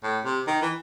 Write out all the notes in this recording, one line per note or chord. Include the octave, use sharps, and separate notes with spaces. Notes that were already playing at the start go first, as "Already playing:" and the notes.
A2
C3
D#3
E3